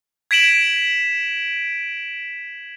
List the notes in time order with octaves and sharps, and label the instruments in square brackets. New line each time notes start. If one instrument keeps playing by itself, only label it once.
[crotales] G#6 B6 D7 E7 F#7